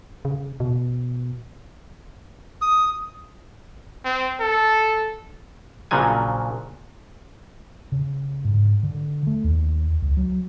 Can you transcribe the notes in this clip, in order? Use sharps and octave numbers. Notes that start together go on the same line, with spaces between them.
C#3
B2
D#6
C4
A4
A#1 A#2 C#3 F3 F#3 G#5
C#3
G#2
D3
A3
D#2
C#2
F#3